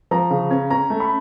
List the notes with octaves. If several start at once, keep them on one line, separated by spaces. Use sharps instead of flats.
F3 A#5
C#3
C#4
C#4 A#5
A3
B5